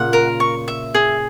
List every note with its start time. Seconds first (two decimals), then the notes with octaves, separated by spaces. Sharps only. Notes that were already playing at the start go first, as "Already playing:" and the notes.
Already playing: A#2 C#3 F#5
0.13 A#4
0.40 C#6
0.68 E5
0.95 G#4